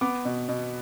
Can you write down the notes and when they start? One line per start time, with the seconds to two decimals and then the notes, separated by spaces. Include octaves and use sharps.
0.01 B3 D6
0.25 B2
0.48 B2